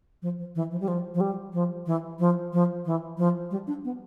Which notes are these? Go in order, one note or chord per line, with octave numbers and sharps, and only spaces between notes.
F3
F3
E3
F3
G3
F3
F3
G3
F3
E3
F3
F3
E3
F3
G3
D4
B3